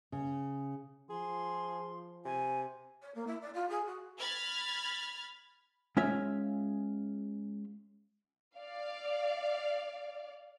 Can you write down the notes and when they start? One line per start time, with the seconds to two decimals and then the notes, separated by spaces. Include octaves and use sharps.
0.12 C#3
1.10 F3 G#4 C6
2.25 C3 G#5
3.02 C#5
3.15 A#3
3.27 E4
3.42 D5
3.54 F4
3.69 G#4
3.86 F#4
4.18 B5 F6 G#6 A6
5.97 G#3 C#4 F4 E5
8.56 D5 F5